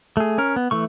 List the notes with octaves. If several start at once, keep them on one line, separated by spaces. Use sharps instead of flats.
A3 G#4
C#4 A#4
B3
E3 A3 C#6